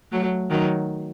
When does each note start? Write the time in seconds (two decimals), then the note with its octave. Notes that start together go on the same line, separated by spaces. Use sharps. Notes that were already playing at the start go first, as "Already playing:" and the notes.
0.12 F#3 A3
0.50 D#3 F#3